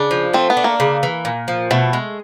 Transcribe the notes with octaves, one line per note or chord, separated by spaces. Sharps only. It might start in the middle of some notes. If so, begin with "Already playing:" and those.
Already playing: C#3 D4
F3
A3 C4
B3
D4
A#3
C#3
E3
A#2
F3
B2 A3
G#3